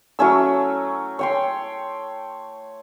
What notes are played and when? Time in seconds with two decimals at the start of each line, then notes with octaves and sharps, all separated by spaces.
0.19 F#3 A3 C#4 E6
1.19 C#5 G5 C6